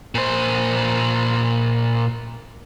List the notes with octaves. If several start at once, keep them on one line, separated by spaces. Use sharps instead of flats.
A#2 C5